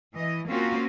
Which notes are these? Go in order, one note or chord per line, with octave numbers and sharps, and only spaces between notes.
E3 D#5
A#3 C4 C#4 F4 F#4